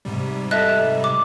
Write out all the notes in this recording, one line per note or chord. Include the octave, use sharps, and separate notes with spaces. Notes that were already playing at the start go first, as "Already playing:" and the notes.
G#2 C3 G3
A4 D#5 E5 F#6
D6